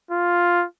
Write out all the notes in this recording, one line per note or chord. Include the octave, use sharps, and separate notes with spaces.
F4